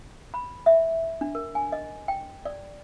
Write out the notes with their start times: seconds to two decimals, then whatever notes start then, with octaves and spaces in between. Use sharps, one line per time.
0.34 B5
0.66 E5
1.21 D4
1.35 A#4
1.55 G#5
1.72 D#5
2.08 G5
2.45 D5